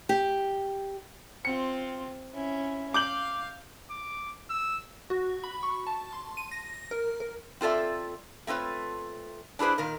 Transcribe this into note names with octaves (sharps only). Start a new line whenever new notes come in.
G4
C4 F4 C#7
C#4 E4
F5 D6 G6 F#7
D6
E6
F#4
B5
C#6
A5
C6
D#7
A#6
A#4
A#4
C4 F4 A4 D5 E5
A3 C4 F4 B4 C#5
D4 E4 G#4 B4 C5
A#2 D#3 A#4